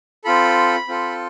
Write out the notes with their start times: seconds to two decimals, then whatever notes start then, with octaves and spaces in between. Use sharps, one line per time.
0.24 C4 F4 A4 B5
0.88 C4 F4 A4